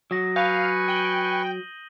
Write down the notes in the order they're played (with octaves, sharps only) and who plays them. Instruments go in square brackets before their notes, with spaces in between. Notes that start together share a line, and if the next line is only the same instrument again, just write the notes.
[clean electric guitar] F#3 [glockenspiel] D#6 A#6
[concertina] B4 G#5 C#6 [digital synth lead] F5 [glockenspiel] G6
[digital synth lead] G5 [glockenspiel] D#7 F#7 G7